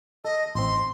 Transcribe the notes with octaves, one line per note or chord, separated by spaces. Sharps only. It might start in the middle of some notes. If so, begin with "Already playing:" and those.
A4 D#5
A1 C4 C6